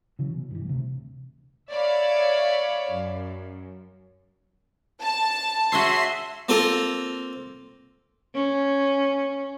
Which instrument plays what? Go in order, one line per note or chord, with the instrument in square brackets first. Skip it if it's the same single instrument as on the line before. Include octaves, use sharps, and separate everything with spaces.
[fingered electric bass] C#3 E3 F#3
B2
G2 E3
D2 C3
[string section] C#5 D5 E5 F5 B5
F#2
[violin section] A5
[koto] F#4 G#4 C#5 [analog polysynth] E5 C6
[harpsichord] A#3 C4 F4 A4 A#4
[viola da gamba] C#4